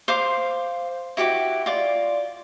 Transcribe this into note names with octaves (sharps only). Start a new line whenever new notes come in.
C5 F5 D6
E4 F#4 G4 D6
F4 D5